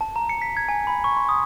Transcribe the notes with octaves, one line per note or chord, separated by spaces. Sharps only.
A5
A#5
C#7
B6
G#6
G#5
B5
C#6
C6
D#6